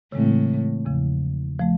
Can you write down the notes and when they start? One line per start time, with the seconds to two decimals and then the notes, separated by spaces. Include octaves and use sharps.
0.12 A2 C#3 E3 G#3 C4
0.85 E2 C#3 F3
1.60 F3 A3